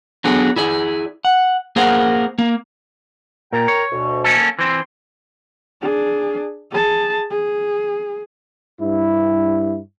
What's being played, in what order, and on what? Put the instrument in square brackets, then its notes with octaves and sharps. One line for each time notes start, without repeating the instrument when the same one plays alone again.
[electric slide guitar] F#3 B3 D4 G#4 A4
E4 G#4 D5
F#5
A#3 G#4 A#4 C5 F#5
A#3
[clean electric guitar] A#2 [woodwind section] A#4 G5 A#5
[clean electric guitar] C#5
[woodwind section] D2 B2
[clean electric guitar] A#3 C#4 A4
[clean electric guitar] E3 C4 [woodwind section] C6
[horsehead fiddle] D4 G#4
G#4 A5
G#4
[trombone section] G2 E4